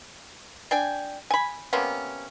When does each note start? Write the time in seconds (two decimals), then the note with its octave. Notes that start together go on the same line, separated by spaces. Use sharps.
0.71 D4 G5 G#5
1.31 G#5 B5
1.73 C3 A#3 B3 C#4